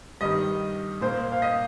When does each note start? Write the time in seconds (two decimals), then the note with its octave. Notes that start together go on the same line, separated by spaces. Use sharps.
0.21 G2 D#3 G3 D#5
1.01 A#2 A#3 C5
1.32 F5
1.42 D#5